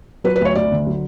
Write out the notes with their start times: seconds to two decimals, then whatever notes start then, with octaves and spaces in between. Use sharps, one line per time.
0.24 F#3 B4
0.36 B4
0.41 D2 C#5
0.55 D2 D5
0.71 D3
0.86 F#3